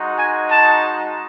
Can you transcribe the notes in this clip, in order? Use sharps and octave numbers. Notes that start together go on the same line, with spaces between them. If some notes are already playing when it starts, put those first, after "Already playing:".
Already playing: G#3 D#4 F#4
G#5
A5